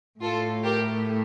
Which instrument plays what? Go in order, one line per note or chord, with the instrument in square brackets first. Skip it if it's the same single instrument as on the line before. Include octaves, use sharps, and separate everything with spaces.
[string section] A2 A3 F4 A4
G4 A#4